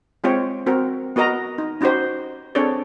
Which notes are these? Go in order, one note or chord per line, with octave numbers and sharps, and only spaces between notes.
G#3 C4 F4 G4 C#5 G5
C4 F#4 A#4
B3 F#4 A#4 D#5 A#5
D#4
C#4 D#4 F#4 G4 C5
C4 D4 G#4 A4 C#5 D5